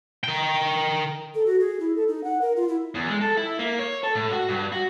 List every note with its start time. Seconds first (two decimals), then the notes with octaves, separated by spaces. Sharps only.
0.24 A#4 G5
1.35 A4
1.46 F#4
1.60 G#4
1.80 E4
1.96 A4
2.08 D#4
2.24 F#5
2.41 A#4
2.56 F4
2.68 E4
2.95 E2
3.09 G#3
3.21 A4
3.37 E4
3.59 A#3
3.79 C#5
4.04 A4
4.15 A2
4.32 F#4
4.48 G2
4.72 F#4